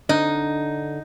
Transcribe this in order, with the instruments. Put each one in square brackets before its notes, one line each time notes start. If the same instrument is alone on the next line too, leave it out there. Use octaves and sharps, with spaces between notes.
[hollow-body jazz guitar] D3 D4 D#5 [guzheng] D#4